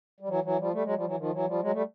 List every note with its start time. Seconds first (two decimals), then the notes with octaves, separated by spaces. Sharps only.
0.20 G3
0.28 E3 F#3
0.44 E3 F#3
0.59 F3 G3
0.73 G3 A3
0.84 F#3 G#3
0.95 F3 G3
1.06 E3 F#3
1.17 D#3 F3
1.32 E3 F#3
1.47 F3 G3
1.61 F#3 G#3
1.73 G3 A3